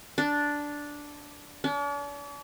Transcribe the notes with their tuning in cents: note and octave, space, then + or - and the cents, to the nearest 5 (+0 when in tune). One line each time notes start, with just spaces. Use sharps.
D4 -5
D4 -45